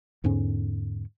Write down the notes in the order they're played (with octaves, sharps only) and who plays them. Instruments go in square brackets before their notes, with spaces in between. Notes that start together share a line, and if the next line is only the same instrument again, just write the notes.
[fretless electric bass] E2 G#2 D3 C#4